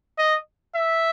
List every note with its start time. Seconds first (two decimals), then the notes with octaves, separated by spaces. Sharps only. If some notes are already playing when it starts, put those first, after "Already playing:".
0.18 D#5
0.74 E5